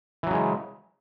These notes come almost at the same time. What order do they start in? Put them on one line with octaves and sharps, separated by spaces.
E3 F#3 C#3 G#3